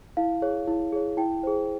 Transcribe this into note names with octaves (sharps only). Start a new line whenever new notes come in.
E4 F5
G#4 C#5
E4
G#4 C#5
E4 G5
G#4 C5